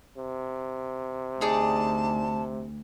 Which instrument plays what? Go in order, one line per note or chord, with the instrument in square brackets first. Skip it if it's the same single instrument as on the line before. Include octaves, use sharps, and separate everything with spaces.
[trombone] C3
[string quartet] D2 [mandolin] D#4 G#4 D5 [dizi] A5